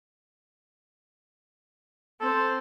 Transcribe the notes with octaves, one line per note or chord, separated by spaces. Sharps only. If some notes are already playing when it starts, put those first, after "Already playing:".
C4 A4 C5